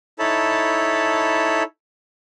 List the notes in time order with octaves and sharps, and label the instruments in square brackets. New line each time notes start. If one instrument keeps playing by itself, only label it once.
[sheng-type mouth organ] D#4 E4 A4 C#5 A5 B5